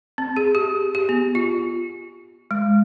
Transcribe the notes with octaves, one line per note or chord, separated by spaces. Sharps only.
C4
G#4
G4
G4
B3
F4
G#3